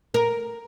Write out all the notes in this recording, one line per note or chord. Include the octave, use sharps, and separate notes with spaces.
A#4